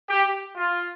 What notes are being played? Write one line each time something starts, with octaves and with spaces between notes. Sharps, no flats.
G4
F4